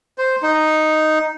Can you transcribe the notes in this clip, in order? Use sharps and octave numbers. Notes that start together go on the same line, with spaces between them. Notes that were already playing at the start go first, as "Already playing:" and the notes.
C5
D#4